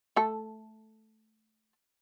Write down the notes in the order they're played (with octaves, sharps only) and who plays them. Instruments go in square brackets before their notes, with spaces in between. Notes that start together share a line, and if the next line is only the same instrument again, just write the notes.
[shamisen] A3 A4